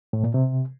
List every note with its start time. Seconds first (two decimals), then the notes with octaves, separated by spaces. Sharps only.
0.13 A2
0.24 A#2
0.34 C3